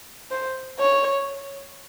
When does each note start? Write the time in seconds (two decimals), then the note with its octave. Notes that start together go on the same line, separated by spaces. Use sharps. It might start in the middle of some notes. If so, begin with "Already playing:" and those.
0.31 C5
0.79 C#5